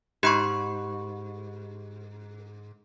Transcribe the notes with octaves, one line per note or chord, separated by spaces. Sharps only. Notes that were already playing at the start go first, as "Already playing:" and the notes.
G#2 G4 B5 C#6